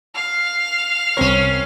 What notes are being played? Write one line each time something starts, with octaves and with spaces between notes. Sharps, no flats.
F5 F6
C2 C4 C#4 A#4 C#5